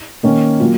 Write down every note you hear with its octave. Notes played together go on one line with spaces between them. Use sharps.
D#3 A#3 C#4
F#3 A#3 F4